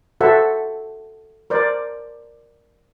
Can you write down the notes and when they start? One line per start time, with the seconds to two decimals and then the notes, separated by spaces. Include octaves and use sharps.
0.21 F#4 A4 C5 E5 F#5
1.50 A#4 C5 D5